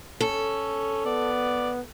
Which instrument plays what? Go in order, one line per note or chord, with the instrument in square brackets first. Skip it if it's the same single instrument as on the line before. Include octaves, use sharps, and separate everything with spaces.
[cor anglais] C#4 [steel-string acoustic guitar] A4
[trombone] B3 [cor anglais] D5